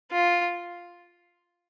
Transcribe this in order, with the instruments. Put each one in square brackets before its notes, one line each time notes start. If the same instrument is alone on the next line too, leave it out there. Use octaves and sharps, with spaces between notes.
[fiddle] F4